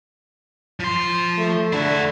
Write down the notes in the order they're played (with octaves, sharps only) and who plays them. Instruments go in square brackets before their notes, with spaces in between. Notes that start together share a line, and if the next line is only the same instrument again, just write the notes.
[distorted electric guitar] F3 C6
[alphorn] A3
[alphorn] D3 [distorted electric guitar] E4 F#4